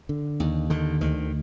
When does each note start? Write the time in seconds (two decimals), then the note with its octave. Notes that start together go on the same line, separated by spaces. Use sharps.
0.09 D3
0.40 D#2
0.70 D3 D#3
1.01 D2 D#3